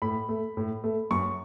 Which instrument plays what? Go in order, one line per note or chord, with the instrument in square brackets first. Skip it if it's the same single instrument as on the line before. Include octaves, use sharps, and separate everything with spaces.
[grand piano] A2 B5
A3
A2
A3
F#2 C#6